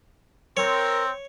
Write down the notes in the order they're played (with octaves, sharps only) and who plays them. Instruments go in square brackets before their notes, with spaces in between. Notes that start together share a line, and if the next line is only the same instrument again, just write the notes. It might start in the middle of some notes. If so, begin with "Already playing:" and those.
[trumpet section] C4 [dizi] A#4 [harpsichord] C#5